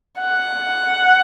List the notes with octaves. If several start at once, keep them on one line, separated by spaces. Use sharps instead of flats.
F#5